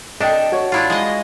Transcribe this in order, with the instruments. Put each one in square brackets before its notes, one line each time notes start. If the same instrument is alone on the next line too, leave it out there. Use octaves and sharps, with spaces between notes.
[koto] D4 A4 [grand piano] D#5 G5
[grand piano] F#4 C#5
[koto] D4 E4 F4
G#3 D#5